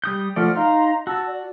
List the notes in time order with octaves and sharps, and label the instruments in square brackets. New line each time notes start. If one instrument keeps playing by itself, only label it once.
[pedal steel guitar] G3 D#6 G6
[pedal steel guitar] F3 A3 D5 [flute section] F#5 F6
[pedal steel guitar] D#4 [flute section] F5 A#5 C6
[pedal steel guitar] F#4 [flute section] F#5 A5 E6
[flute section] D5